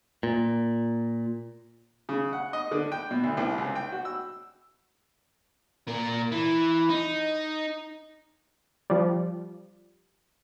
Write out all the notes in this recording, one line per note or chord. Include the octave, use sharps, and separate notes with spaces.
A#2
C#3
F#5
D#5
D3
G5
B2
D2
C2
C#2
G5
F#4
E6
A#2 A#4
E3
D#4
F3 G3